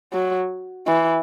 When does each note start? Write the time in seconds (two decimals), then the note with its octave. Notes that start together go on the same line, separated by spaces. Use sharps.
0.13 F#3
0.87 E3